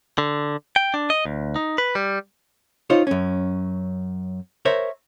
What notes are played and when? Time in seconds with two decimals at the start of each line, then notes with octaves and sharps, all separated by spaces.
0.18 D3
0.76 G5
0.94 D4
1.10 D#5
1.25 D2
1.56 D#4
1.78 B4
1.95 G3
2.90 D#4 F4 C5 C#5
3.07 F#2 C#4
4.65 A#4 C5 C#5 E5